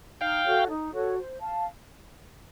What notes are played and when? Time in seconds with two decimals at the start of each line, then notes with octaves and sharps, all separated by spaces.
0.21 D#4 F5 G5
0.45 F#4 A4 C#5
0.69 D#4
0.93 F#4 A4 C#5
1.17 C5
1.41 F5 A5